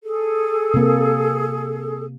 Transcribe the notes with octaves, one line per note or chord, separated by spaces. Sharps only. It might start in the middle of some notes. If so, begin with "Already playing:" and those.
G#4 A4
C3 A#3